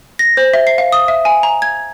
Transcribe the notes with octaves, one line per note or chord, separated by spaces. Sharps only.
A#6
C5
E5
C7
F5
D#6
E5
G#5
A#5
G#6